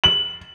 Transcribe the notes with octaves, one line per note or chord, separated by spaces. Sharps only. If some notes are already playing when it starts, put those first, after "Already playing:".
F#7